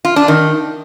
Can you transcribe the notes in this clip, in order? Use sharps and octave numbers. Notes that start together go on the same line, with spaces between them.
F4
D4
D#3